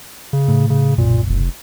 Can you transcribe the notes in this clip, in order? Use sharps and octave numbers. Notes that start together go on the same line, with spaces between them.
C#3
A2
C#3
F#1 B1 A#2
F1